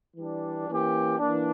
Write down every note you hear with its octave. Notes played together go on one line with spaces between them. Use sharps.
E3 G3 D4
E3 A#3 C#4 G4
E3 A#3 D4